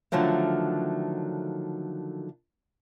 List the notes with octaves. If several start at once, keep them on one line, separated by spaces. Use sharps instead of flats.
D3 D#3 F3 F#3 A3